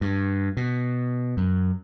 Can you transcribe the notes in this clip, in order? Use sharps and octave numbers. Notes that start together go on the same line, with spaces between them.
G2
B2
F#2